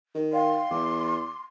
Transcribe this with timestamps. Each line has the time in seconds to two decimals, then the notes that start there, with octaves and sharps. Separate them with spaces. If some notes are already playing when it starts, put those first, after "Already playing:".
0.15 D#3
0.33 D5 F5 G5 C6
0.71 E2 D6